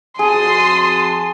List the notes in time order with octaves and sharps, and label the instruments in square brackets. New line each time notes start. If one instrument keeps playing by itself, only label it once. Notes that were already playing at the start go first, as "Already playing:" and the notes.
[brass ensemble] F2 F#4 A5 [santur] G#4 [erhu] C6 [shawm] D#6